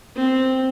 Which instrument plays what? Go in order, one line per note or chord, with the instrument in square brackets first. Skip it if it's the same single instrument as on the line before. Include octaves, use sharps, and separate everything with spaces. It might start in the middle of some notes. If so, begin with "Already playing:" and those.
[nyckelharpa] C4